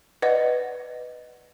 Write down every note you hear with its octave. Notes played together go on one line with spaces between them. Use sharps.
B4 D5 D#5 F#5